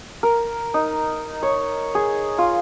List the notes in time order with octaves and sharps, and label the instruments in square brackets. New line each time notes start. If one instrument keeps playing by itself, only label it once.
[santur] A#4
D#4
C#5
G#4
F4